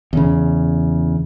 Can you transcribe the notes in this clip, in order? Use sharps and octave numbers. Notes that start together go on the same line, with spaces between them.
E2 C#3